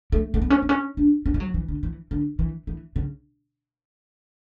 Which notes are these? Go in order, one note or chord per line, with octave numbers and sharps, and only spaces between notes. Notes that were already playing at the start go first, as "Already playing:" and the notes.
A3
A3
B3
C#4
B3
C#4
D4
C#4
G3
F#3
E3
D3
E3
D3
E3
E3
C#3